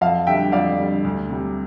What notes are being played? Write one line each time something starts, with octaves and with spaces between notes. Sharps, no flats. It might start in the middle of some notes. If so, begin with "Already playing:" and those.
F2 F5 A5
D3 G3 E5 G5
F2 D5 F5
D3 G3
D2
C3 G3